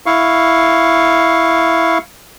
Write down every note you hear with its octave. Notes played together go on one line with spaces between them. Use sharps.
E4 F5 C#6